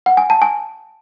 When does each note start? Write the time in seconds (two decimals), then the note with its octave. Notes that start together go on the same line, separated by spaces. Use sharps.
0.06 F#5
0.17 G#5
0.30 A5
0.42 G#5